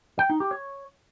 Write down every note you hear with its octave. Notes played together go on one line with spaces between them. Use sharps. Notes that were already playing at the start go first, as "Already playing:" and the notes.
G5
D#4
G4
C#5